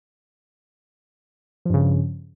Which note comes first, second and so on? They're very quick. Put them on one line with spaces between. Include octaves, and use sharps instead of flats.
F3 G2 C#3